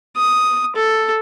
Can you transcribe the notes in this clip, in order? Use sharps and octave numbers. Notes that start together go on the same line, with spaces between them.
D#6
A4